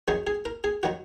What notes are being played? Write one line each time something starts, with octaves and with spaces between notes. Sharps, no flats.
F#2 D#3 F#3 G#4
G#4
A#4
G#4
D#3 F#3 F#4